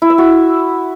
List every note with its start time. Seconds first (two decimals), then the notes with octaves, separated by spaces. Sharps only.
0.02 E4
0.10 E5
0.18 F#4